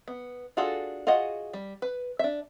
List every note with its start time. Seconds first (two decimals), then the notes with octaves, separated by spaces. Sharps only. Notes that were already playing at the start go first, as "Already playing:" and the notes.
0.08 B3
0.57 D4 F4 F#4 G#4 A4
1.07 F4 F#4 G#4 D#5 F#5
1.53 G3
1.82 B4
2.19 D4 E5